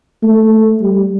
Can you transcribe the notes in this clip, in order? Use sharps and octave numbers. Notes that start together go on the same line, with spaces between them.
A3
G3